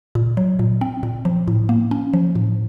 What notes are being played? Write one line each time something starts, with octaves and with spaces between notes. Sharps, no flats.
A#2
F#3
A#2
C4
A#2
F3
A2
A#3
C#4
F3
A2